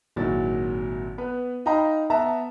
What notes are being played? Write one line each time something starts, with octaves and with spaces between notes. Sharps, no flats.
G#1 A#2 F#3 E4 A6
B3 B4
D#4 D#5 F5 G5 A#5 B5
B3 E5 A5 A#5